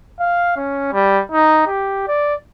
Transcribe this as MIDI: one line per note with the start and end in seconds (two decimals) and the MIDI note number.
0.20 0.53 77
0.57 0.90 61
0.93 1.21 55
1.32 1.67 63
1.67 2.07 67
2.08 2.35 74